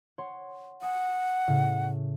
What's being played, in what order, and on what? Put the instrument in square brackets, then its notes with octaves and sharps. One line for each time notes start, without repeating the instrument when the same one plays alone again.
[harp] C#5 F#5 C6
[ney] F#5 [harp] G#5 D#6
[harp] A2 C#3